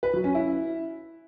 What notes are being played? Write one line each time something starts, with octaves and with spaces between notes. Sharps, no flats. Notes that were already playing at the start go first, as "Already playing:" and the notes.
B4
F#3
C#4
E4